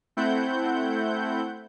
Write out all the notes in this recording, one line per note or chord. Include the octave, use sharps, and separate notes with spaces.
A3 C4 E4 F#5 G6